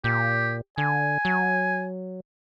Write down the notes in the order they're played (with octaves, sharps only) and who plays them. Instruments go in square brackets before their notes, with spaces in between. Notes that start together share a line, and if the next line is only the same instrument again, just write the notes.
[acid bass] A#2 [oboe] G4
[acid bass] D3 [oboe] G#5
[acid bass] F#3